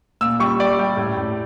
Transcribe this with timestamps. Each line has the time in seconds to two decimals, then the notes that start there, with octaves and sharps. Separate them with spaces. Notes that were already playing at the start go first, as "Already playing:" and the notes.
0.21 A#2 E6
0.40 G3 C#6
0.59 G3 D5
0.79 G3
0.97 A2
1.17 A2